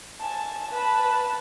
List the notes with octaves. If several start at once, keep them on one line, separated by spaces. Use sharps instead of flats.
G#5 A5
B4 A5